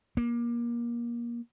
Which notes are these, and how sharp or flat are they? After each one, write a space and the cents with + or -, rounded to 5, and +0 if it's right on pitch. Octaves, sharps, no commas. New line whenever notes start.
A#3 +25